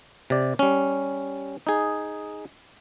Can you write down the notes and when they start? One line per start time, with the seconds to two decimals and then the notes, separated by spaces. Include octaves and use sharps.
0.30 C3 D5
0.59 G3 C#4
1.67 D#4 G#4